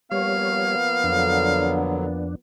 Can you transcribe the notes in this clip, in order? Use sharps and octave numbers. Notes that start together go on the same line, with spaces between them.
F3 G3 A#3 B3 C#5 F5
F2 D3 F#3 D4